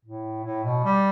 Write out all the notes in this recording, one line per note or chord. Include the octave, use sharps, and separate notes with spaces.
A2
A2
B2
G3